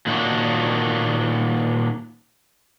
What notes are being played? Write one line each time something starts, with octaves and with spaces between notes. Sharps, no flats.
A#2 D#3 F#3 A#3 D4 F#4